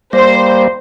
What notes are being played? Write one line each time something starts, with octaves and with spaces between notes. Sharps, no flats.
G3 A#3 C5